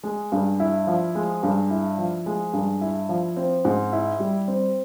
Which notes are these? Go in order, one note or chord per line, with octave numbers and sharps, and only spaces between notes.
G#3
G2
E4
F3
G#3
G2
E4
F3
G#3
G2
E4
F3
C4
G#2
E4
G3
C4